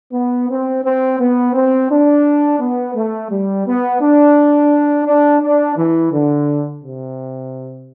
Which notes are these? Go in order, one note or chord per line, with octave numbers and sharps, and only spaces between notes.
B3
C4
C4
B3
C4
D4
B3
A3
G3
B3
D4
D4
D4
E3
D3
C3